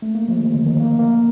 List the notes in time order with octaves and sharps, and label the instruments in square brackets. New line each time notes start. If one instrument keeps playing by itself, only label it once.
[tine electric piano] A3
A#3
F3
D#3
D3
D#3
A#3
A#3